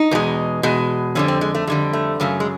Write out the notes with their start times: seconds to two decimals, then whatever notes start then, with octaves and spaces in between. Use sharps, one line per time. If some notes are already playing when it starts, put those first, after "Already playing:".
Already playing: D#4
0.11 E2 B2 G#3
0.63 E2 B2 G#3
1.15 F2 D3 G3 C#4
1.28 C4
1.41 G#3
1.55 A3
1.67 F2 D3 G3 G#3
1.93 A3
2.20 F#2 C#3 F#3 A3
2.40 G#3